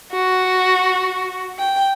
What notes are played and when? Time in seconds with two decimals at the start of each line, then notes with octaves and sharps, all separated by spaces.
0.12 F#4
1.58 G5